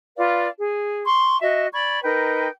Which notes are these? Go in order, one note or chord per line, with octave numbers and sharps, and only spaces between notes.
F4 B4 D5 F5
G#4
C6 C#6
F#4 D#5 E5
D5 B5 C#6 G#6
D#4 A#4 B4 G5